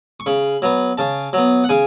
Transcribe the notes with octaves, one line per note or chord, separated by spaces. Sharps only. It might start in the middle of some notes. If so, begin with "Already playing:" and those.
C#6
C#3 B5
F#3 B3
C#3 A5
F#3 B3
F#5
C#3 G#5